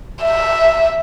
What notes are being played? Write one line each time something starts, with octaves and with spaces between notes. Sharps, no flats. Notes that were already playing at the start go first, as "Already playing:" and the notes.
E5